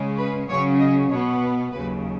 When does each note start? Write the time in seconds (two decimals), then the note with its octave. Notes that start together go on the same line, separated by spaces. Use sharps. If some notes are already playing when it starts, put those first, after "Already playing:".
Already playing: C#3 G#3 C#4
0.17 B4
0.48 C#3 F#3 C#4 C#5
0.79 D#5
1.10 B2 B3 C#5
1.41 B4
1.72 D#2 C#3 F#3 B4